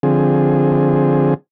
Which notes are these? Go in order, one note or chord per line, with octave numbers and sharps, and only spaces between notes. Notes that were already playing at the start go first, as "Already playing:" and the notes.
D3 F3 C4 G#4